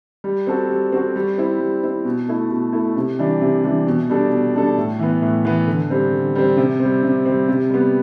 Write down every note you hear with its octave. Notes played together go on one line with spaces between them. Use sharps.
G3
C4 F#4 A4
G3
C4 F#4 A4
G3
C4 E4
G3
C4 E4
B2
A3 E4
B2
A3 E4
C3
E3 G3 D4
C3
E3 G3 D4
B2
G3 D4 A4
B2
G3 D4 A4
A2
E3 B3
A2
E3 B3
D3
G3 C4
D3
G3 C4
C3
C4
G3
C3
G3 C4
C3
G3 B3